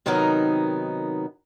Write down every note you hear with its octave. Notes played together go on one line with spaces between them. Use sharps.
C3 D#3 F#3 B3 D#4 A#4